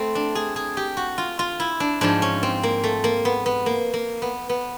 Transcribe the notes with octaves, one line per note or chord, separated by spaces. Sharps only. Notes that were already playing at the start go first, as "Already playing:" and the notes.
Already playing: A3 C4 E4
D4
G#4
G#4
G4
F#4
F4
F4
E4
D4
G#2 F3 G#3 D4
C#4
C4
A#3
A3
A#3
B3
B3
A#3
A#3
B3
B3